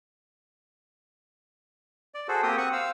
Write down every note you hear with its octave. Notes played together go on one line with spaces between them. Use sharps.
D5
F#4 G#4 A4 C5
A#3 C4 G4 G5 D#6
C4 F#5 C#6 D#6
C5 F5 E6